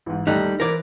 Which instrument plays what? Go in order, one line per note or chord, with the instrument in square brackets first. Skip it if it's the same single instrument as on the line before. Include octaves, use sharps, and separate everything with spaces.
[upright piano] A1 G#2
[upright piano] D#2 A3 F#6 [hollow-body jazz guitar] G3 D#4
[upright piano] E3 C5 [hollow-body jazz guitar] A#4 D5